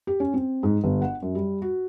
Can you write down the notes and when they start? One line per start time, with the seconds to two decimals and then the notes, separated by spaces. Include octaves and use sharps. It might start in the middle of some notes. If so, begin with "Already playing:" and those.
0.07 G4
0.20 C#4
0.34 C4
0.63 G#2
0.84 G1
1.02 F#5
1.22 F#2
1.35 G3
1.62 F#4